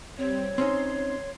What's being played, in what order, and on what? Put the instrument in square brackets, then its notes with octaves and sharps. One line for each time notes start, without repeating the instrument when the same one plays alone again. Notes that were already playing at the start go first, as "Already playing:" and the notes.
[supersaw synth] G3 C4 [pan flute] C#5
[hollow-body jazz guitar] C4 C#4 D#4 [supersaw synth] C6